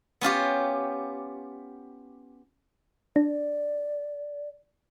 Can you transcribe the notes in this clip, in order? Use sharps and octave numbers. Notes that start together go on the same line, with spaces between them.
B3 C#4 F4 G4
D4 D5